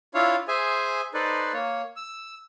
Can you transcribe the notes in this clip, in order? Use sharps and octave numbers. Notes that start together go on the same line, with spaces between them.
D4 E4 F4 C#5 F5
G#4 C5 E5 G#5
D#4 A4 B4 C5 D5
A#3 C#5
E6